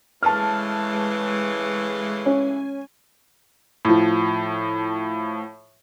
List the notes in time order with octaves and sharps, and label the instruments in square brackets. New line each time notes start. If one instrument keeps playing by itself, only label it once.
[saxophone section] A2 C#3 E3 [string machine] G#3 C7 [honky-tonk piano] A5 F6
[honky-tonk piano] C#4 [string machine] G#5
[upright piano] A2 F3